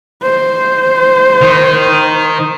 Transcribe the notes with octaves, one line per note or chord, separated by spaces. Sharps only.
C5
D#3